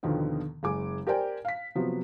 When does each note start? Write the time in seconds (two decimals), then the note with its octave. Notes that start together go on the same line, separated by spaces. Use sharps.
0.03 D#2 B2 D3 D#3 F3 B3
0.63 F#1 G#3 G#5 D6
1.07 G4 A#4 C5 D5 G5 G#5
1.45 F5 B6
1.75 C3 F3 F#3 B3